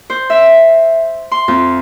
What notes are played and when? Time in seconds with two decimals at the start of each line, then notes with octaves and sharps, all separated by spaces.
0.10 C5
0.30 E5
1.31 C6
1.48 F2